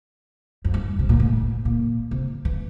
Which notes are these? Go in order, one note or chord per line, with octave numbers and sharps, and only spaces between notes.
F2
G2
C3
A#2
A2
A#2
C3
E3